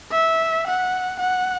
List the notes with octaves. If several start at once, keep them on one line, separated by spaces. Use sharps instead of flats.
E5
F#5
F#5